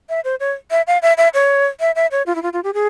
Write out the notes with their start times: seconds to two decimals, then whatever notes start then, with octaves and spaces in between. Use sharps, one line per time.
0.09 E5
0.24 C5
0.40 C#5
0.71 E5
0.87 F5
1.02 E5
1.17 E5
1.34 C#5
1.80 E5
1.95 E5
2.11 C#5
2.26 F4
2.35 E4
2.43 F4
2.53 F4
2.64 G4
2.74 G#4